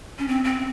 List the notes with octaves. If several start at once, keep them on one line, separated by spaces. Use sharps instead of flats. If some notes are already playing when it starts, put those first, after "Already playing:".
C#4
C4
C4